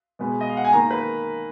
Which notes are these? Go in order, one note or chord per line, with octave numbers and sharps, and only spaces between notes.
B2 G#3 B3
D#5
F5
F#5
G#5
D#3 A#3 A#5
B4